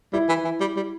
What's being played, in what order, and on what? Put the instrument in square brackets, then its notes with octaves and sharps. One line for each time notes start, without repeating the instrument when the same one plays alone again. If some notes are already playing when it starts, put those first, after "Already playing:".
[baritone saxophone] G3 [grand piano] E4
[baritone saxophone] E3
E3
G3
G3